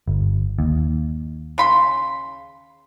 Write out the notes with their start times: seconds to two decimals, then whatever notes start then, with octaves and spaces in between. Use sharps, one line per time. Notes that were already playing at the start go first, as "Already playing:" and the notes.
0.08 G1
0.59 D#2
1.58 C#3 B5 C6